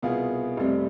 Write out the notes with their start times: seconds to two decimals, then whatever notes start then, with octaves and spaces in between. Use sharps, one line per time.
0.02 C2 B2 B3 F4 G#4
0.57 F1 F2 C3 G3 C4